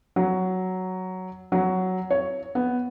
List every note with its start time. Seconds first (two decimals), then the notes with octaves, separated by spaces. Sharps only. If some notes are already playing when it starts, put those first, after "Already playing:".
0.16 F#3
1.52 F#3
2.11 C#5
2.55 B3